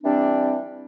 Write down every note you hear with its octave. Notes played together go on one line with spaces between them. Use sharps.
E3 G3 C4 D4